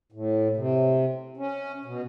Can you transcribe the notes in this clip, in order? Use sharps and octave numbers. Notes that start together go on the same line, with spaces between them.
A2
C3
C#4
B2